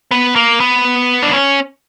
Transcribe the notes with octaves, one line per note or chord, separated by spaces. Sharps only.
B3
A#3
B3
D4
C#4